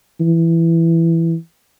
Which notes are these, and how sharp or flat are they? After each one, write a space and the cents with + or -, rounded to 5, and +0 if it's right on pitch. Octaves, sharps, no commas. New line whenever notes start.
E3 +10